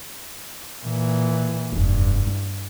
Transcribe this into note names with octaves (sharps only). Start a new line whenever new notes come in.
A#2 E3
F1 E2 G2
E4